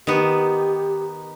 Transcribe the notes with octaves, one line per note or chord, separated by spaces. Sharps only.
D#3 B3 G4